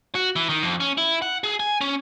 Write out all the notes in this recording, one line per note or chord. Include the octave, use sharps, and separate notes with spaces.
F#4
E3
D#3
F2
C#4
E4
F#5
G#4
G#5
C#4